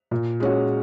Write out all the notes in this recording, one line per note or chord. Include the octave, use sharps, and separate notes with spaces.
A#2
G#3 C#4 F#4